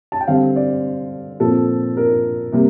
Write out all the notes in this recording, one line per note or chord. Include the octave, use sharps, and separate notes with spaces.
A5
G5
D3 G3 C4 F5
D5
A#2 F3 C4 A4
A#4
C3 G3 A#3